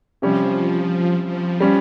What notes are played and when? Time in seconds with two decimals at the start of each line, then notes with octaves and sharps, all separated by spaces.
0.22 C3 F3 G3 C#4
1.25 F3
1.60 G3 C#4